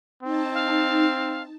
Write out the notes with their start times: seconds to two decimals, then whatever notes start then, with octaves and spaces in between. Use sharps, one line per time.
0.23 C4 D#4 A5
0.54 F5